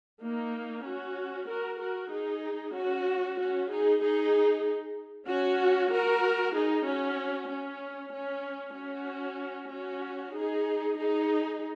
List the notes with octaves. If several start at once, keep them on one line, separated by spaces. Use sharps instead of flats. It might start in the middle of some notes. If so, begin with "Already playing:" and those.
A#3 D#4
C#4 F#4
F#4 A#4
F#4 A#4
D#4 G#4
C#4 F#4
C#4 F#4
D#4 G#4
D#4 G#4
C#4 F#4
F#4 A#4
D#4 G#4
C#4 F#4
C#4
C#4
C#4 F#4
C#4 F#4
D#4 G#4
D#4 G#4